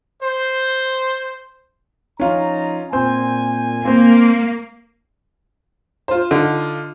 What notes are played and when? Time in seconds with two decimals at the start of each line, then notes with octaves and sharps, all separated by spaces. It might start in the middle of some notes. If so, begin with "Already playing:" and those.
0.23 C5
2.20 F3 C#4 D#4 F4 A#5
2.93 A#2 C4 C5 G#5
3.85 A#3 C4 C5
6.08 F4 C5
6.31 D3 D#4 F4